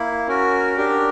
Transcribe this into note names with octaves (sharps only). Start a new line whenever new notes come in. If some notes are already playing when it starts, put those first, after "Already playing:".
Already playing: A#3 E4
C#4 F#4 A#4
D4 G4 A#4